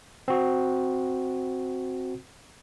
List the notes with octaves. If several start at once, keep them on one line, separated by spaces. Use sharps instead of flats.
C4 F#4